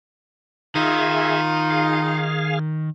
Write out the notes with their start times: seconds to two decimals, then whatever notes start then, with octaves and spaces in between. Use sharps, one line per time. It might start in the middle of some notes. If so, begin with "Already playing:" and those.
0.75 D#3 D#4 F4 G#4 E5
1.70 G#4 F5